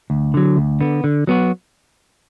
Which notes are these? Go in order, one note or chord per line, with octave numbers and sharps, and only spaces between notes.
D2
D3 F#3
D2
D3 B3
D3
F#3 B3 F#4